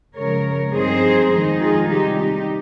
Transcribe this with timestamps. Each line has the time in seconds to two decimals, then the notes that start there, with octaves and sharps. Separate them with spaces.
0.16 C#3 F3 G#3 A#4 C#5
0.73 G2 F3 C4 D#4 G#4 C5
1.32 F2 D#3 G#3 D#4
1.60 F4 G#4
1.90 C3 D#3 G3 D#4 G4
2.19 D#4 G4